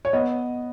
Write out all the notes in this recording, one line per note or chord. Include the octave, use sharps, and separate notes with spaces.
C#5
B3 D#5